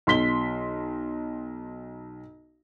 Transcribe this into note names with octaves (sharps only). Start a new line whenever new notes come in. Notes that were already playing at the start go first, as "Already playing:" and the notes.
B1 C6 B6 G7